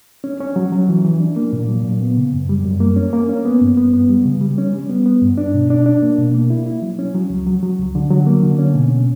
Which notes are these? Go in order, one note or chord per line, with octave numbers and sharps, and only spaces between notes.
C#4
C#4
F#3
F#3
E3
E3
D4
A#3
A#2
F#3
A#2
B3
C#3
F#2
G3
F#2
A#3
C#4
A#3
C#4
B3
G2
B3
B3
G3
C#3
G3
C#4
G3
B3
B3
G2
D4
B2
D4
D4
A#3
B2
A#3
E4
E4
F#3
C#4
F#3
C#2
F#3
F#3
C#2
D3
F#3
A#3
D3
C#4
B2
C#4